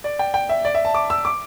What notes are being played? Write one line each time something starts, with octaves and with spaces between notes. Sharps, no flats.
D5
G5
G5
E5
D5
E5
A5
D6
E6
D6